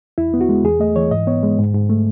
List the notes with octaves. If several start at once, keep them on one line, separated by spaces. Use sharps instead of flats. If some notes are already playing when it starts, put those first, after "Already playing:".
E2 E4
B3
F#4
G#3
E2 G#4
A3 D#5
E3 C#5
G#2 D#5
B3 C#5
G#3
G#2
G#2
A3